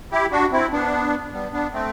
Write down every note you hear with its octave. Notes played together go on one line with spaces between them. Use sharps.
E4 G4
D4 F#4
C4 E4
B3 D4
G3 B3
B3 D4
A3 C4